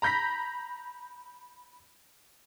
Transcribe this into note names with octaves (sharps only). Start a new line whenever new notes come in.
A#5 B5 G6 A#6 B6